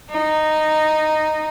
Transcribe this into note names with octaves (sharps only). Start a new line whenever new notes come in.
D#4